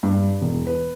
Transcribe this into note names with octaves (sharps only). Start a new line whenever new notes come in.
G2
E1
B4